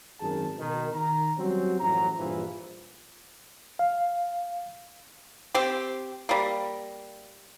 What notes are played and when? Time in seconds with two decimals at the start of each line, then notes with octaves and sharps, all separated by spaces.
0.20 G#1 F#2 D#3 G#4 A#4 A5
0.59 B2 D#3 A#4
0.93 D#3 A#5
1.38 F#3 G3 C4 C#4 F#4
1.80 A1 F#2 A2 F3 F#3 A#5
2.16 A#1 G2 E3 F3
3.79 F5
5.54 C4 G4
6.29 G3 A#3